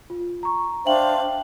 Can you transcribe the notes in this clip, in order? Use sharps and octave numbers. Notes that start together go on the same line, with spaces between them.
F4
A#5 C#6
D4 C5 E5 F5 G5 F#7